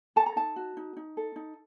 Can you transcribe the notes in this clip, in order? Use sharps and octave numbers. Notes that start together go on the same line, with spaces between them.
A4 A5
A#5
D#4 A5
F#4
D#4
D#4
A4
D#4